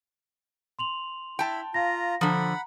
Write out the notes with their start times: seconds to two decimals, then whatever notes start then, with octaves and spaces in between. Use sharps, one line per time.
0.79 C6 F7 F#7
1.39 E4 G5 A5 B5
1.74 F4 F5 A#5 A#6
2.21 D3 F3 F#5 A#5 B5